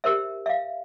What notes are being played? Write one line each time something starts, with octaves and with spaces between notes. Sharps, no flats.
G4 A#4 C5 E5
E5 F5